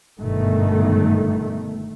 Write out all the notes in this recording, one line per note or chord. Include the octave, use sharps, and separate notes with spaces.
G1 G#2 B2 D#3 A3